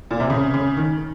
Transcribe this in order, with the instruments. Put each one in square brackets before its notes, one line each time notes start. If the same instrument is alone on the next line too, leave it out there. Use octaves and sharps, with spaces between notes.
[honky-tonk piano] A#2
C3
C#3
C#3
D#3